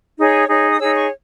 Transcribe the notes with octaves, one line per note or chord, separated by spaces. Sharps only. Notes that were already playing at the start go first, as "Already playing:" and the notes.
D#4 G#4 C#5
D#4 G#4 C#5
D#6
D#4 G#4 C#5 E6
C#6